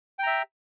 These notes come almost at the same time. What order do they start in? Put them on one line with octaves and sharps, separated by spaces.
G5 A#5 E5